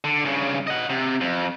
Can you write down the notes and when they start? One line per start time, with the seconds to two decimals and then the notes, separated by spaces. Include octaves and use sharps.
0.04 D3
0.25 G2 C#3
0.67 D#5 F#5
0.89 C3
1.21 F2